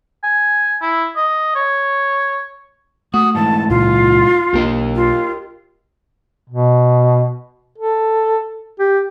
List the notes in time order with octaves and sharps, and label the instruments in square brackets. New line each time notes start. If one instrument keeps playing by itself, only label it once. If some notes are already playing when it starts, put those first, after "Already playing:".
[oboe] G#5
E4
D#5
C#5
[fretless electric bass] A3 [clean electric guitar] F#4 [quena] D#6
[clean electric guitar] G#2 E3 [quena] A5
[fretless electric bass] C#2 A#2 [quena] F4
[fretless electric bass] B1 A#3 D4 [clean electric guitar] G4 A#4 D#5
[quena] F4
[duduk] B2
A4
G4